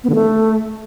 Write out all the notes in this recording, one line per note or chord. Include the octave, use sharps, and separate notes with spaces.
B3
D3
A3